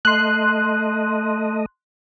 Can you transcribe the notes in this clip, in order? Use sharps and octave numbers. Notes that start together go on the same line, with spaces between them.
A3 D#5 C6 F#6